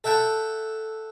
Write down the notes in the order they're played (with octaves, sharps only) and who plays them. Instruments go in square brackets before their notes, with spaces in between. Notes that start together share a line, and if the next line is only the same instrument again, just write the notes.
[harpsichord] A4 E5 F#5 G5 A5